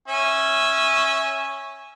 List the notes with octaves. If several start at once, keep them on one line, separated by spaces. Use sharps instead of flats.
C#4 E5 G#5